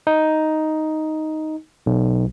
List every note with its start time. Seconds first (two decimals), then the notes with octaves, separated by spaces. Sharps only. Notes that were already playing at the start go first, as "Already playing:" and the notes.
0.07 D#4
1.86 B1